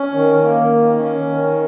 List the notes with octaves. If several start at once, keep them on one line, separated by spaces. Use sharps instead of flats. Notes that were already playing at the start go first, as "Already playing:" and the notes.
Already playing: C#4
D#3
A#3
D#3
C#4
D#3